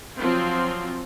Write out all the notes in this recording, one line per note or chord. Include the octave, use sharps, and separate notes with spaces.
F3 F#3 C4 F4